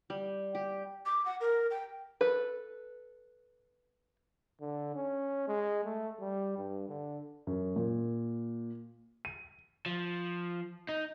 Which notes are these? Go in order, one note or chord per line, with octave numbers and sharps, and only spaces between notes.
G3
G4
D6
F#5
A#4
G5
A4 B4
D3
C#4
G#3
A3
G3
G2
D3
F#2
A#2
D#7
F3
D#4